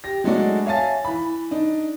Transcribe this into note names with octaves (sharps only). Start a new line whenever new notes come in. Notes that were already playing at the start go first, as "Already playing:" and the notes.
G4 A#6
F#3 G#3 A3 D4 F#4 D5
C#5 E5 F5 G#5 A5 A6
E3 B5
D4 D#4